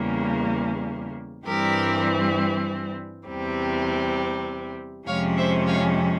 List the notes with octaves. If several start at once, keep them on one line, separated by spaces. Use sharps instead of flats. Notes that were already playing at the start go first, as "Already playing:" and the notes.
Already playing: E2 C#3 G3 A#3
G2 E3 G3 C4 G4 A#4
E2 C3 G3 C4
F2 C3 F3 G#3 C#4 C#5 F5
C5 E5
C#5 F5